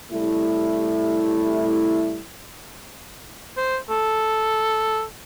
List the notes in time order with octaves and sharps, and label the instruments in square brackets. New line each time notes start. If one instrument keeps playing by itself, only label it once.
[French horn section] C3 G3 A3 E4
[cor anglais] C5
A4